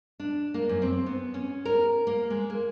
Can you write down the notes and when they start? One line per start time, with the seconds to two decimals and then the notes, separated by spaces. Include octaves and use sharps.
0.20 D4
0.54 A#3
0.69 F#2
0.82 C4
1.06 B3
1.34 C#4
1.65 A#4
2.07 A#3
2.30 G#3
2.50 A#3